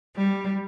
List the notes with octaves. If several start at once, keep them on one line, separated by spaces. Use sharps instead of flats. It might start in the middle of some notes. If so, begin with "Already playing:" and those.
G3